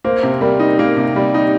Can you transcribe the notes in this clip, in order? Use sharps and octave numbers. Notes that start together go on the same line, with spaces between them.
A#3 C5
C3
G3 A#4
D#4
A#3 A#4
C3
G3 G4
D#4